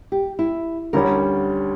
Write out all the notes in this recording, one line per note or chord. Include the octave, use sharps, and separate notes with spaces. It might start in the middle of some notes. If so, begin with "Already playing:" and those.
G4
E4
D2 D3 G3 C#4 A#4